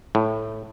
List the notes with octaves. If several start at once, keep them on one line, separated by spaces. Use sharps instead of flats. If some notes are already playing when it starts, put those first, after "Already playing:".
A2